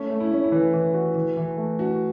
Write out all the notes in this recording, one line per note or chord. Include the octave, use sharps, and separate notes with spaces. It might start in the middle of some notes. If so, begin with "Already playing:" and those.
Already playing: A3 C#4
A3
E4
A3 C#4
E4
E3
E3
F#4
E3
E3
A3
A3 F#4